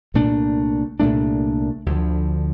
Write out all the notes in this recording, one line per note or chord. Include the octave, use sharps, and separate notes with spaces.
C2 A#2 A3 D4
C2 A#2 A3 D4
D2 D3 F3